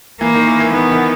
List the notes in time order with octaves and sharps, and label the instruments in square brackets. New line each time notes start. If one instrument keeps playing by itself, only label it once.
[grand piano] E3 [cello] A#3
[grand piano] D#3
E3
E3
[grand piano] D#3 [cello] B3
[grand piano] D#3